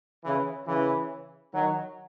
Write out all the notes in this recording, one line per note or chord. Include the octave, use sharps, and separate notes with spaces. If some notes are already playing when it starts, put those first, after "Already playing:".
C#3 E3
C#3 E3
D#3 F#3